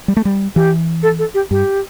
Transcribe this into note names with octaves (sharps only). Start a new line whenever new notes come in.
G3
A3
G3
E3 G4
A4
A4
G4
G2 G4